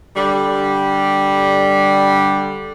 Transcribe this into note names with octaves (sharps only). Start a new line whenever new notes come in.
D3 G3